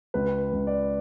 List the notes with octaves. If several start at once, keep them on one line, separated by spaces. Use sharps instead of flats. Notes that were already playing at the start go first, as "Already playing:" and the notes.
C#2 B4
C#2
D5